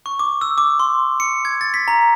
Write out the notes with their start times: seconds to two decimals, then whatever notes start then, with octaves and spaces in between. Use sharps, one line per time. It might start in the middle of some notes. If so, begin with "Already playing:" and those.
0.06 C#6
0.19 D6
0.41 E6
0.58 D6
0.79 C6
1.20 C#7
1.45 G#6
1.61 A6
1.74 B6
1.88 A#5